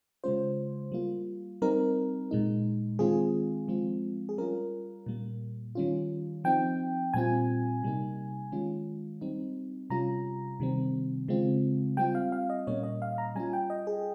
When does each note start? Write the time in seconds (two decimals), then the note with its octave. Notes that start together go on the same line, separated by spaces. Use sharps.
0.24 C#3 G#3 C#4 F4 C5
0.92 G3 A#3 F4
1.62 G3 C4 D#4 A#4
2.31 A#2 G#3 D#4
2.99 D#3 G#3 C4 F4 G#4
3.68 F3 G#3 C4 F4
4.29 G#4
4.38 G3 C#4 F4 A#4
5.06 A#2 G3 A#3
5.75 D#3 G3 C#4 F4
6.44 F3 C4 D#4 G5
7.14 A#2 G3 C4 F4 G#5
7.83 C3 G3 A#3 D#4
8.52 D#3 G#3 C#4 F4
9.21 G3 C4 D#4
9.90 C3 G3 C#4 F4 A#5
10.60 C3 D#3 G3 C4
11.28 C#3 G#3 C4 F4
11.97 G3 C4 F4 G5
12.15 F5
12.32 F5
12.50 D#5
12.67 A#2 G3 A#3 C#4 C#5
12.83 D#5
13.02 F5
13.18 A#5
13.35 G3 C#4 F4 G#5
13.53 G5
13.70 D#5
13.87 G#4